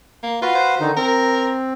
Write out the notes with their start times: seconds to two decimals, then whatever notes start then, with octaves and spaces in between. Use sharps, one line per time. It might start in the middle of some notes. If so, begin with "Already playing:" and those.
0.23 A#3
0.42 F4 F#4 B4 F5
0.55 C5
0.81 D3 D#3 D#4
0.97 C4 A#4